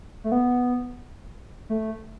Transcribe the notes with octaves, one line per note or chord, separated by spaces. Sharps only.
A3
B3
A3